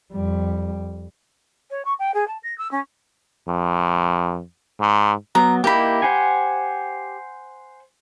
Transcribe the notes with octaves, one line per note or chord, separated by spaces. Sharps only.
F2 G3
C#5
C#6
G5
G#4
A5
A#6
E6
C#4
F2
G#2
F#3 B3 A#5
A#3 D#4 E4 G4 B5
C5 F#5 G#5